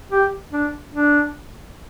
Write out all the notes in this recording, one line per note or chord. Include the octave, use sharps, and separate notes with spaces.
G4
D4
D4